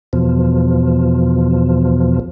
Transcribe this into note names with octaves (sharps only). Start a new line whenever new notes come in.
E2 B2 F3